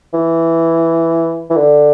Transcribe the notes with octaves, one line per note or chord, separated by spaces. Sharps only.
E3
E3
D3